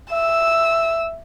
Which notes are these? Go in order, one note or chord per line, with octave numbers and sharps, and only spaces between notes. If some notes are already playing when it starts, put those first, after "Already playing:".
E5 E6